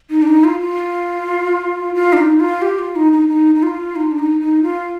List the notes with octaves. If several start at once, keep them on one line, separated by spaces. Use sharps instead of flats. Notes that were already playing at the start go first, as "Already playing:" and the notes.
D#4
D4
D#4
F4
F4
F4
D4
D#4
F4
G4
F4
D#4
D#4
D#4
D#4
F4
D#4
D4
D#4
D#4
F4